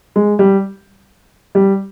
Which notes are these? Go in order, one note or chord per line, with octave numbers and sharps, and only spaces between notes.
G#3
G3
G3